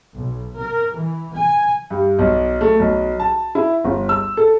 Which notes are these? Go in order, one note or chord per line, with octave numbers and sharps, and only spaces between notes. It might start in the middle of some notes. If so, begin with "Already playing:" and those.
B1
A#4
E3
G#5
G2
B1
A3
B1
A5
E4
G1
E6
A4